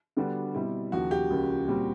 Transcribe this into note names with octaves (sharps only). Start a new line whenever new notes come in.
D3 G3 B3 D4 F#4
B2 G3 C4 E4
D#2 C#3 F3 F#4
G4
C#2 C#3 F3 A#3 C#4
A#2 G3 C4